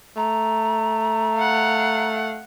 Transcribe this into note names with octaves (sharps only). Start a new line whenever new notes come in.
A3 A#5
F5 F#5